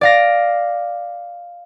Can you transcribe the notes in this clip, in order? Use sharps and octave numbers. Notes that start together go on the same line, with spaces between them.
D5 F5 A#6